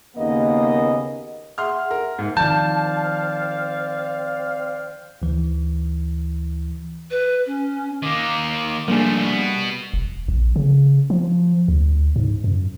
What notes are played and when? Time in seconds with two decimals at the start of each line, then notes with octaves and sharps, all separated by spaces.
0.17 D#2 C#3 A#3 B3 D#5
1.58 G#4 E5 F#5 C6 F6
1.91 A#4
2.19 G#2
2.37 D#3 F3 C4 D5 F5 A5 G6
5.22 D2 E3
7.11 B4
7.46 C#4
8.02 D#3 A#3 D6
8.88 F3 G3 A3 A#3 D4 G#4
9.25 B3 F#4
9.94 E1
10.28 A#1
10.56 C#3
11.10 F3
11.68 D2
12.16 G#2
12.44 F#2